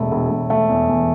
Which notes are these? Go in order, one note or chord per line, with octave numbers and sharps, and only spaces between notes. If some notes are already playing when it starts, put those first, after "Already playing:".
Already playing: E1 A3
E1
E1
A3
E2
E2